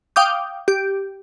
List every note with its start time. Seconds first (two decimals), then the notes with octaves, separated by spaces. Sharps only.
0.16 F5 G5 D6 D#6 G6
0.68 G4